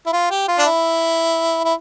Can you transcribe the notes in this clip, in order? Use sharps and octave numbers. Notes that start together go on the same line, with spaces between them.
E4
F4
G4
F4
D4
E4
E4